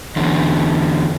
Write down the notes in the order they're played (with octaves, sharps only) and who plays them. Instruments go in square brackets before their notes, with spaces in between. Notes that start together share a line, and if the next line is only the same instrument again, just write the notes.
[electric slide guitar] E2 D3